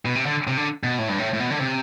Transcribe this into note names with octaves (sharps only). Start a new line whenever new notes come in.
B2
C3
D3
C3
D3
B2
A2
G2
A2
A2
B2
D3
C3